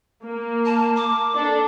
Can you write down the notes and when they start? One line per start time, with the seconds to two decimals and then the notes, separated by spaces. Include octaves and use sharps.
0.24 A#3
0.66 A5
0.96 D6
1.35 D4 A4